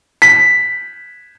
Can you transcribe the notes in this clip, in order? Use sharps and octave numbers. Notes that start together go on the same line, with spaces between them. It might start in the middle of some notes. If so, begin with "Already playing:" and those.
B6